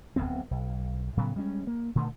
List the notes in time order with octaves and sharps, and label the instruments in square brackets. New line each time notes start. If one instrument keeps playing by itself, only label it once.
[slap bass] D1 G1 B3 C4
B1
A2 C#3 F#3 B3
G3 G#3 C4 C#4
A#3
A#2 D3 D#3 A3